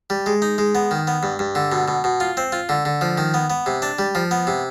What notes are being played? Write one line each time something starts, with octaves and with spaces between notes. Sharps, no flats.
G3
G#3
D#4
G#3
B3
D#3
B3
G2
G2
D3
B2
B2
B2
F4
C4
F4
D3
D3
F3
D#3
B3
B3
C3
D4
G3
F3
B3
C3